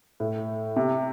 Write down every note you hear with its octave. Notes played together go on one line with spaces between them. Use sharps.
A2
C3